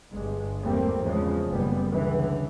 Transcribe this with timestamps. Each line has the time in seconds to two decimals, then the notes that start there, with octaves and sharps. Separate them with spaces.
0.12 G1 G2 G#3
0.63 E2 G#2 G3 A3 A#3 C4
1.02 E2 A2 C#3 F3 G#3
1.50 F#1 A#2 G3 B3
1.89 C#2 A2 D3 E3